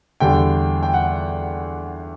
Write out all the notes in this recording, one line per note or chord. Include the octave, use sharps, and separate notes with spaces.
E2 D3 G3 G5
G5
F#5